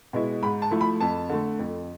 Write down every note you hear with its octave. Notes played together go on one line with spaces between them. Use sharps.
B2 G#3 B3 E4
G#2 B5
A5
F3 A3 E4
B5
F2 A5
D3 A3
F2